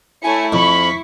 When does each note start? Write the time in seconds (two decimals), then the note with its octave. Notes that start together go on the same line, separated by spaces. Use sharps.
0.23 A3 E4 C#5 G#5 C#7
0.53 F2 B5 C#6 B6